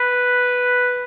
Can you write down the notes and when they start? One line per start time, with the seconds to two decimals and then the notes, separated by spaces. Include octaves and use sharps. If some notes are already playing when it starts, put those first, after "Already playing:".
Already playing: B4